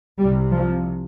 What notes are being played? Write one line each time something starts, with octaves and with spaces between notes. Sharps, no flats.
C2 C3 G3
F3